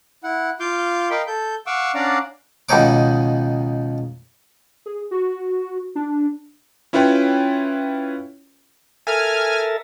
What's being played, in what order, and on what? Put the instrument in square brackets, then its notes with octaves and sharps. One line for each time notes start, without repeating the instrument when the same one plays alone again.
[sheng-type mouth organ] E4 F#5
F4 F5 D6 G6
A#4 D#5 F5 G5 B5
A4 G6
F5 F#5 C#6 D6 E6
C#4 D4 D5 F5 F#5 A#5
[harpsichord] C#2 B2 D#3 D#4 C#5 D6
[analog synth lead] G#4
F#4
D4
[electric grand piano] C#4 E4 F4 B4 C#5 G5
[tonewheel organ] A4 A#4 E5 [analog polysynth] G#5 F6